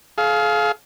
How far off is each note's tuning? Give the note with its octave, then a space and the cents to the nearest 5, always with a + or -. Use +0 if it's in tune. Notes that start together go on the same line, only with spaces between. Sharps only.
G#4 +40 F5 +0